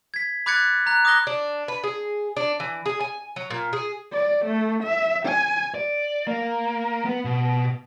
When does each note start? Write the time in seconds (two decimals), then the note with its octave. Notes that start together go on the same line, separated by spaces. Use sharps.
0.14 G#6 B6
0.46 B5 D6 F#6 G#6 A6 C#7
0.86 A#5 F#6
1.05 D6 D#6 F#6 A#6 G7
1.27 D4
1.68 B4
1.84 G#4
2.37 D4
2.60 E3
2.86 G#4
3.01 G#5
3.36 F#3
3.50 A#2
3.73 G#4
4.13 D5
4.45 A3
4.83 E5
5.26 G#5
5.74 D5
6.27 A#3
7.05 B3
7.25 B2